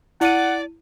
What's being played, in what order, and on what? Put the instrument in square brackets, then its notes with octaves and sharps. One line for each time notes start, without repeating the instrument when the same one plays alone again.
[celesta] E4 D#7 [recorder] D5 [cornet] F#5